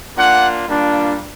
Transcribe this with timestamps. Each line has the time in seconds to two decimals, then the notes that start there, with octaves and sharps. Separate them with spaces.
0.16 A#3 D4 F4 F#5
0.66 G3 A#3 D4 F4